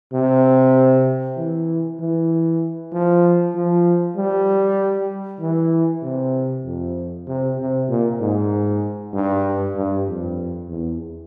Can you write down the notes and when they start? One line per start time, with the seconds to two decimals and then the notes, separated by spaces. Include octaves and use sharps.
0.13 C3
1.37 E3
2.00 E3
2.92 F3
3.55 F3
4.17 G3
5.41 E3
6.03 C3
6.65 F2
7.27 C3
7.59 C3
7.89 A#2
8.20 G#2
9.13 G2
9.76 G2
10.07 F2
10.69 E2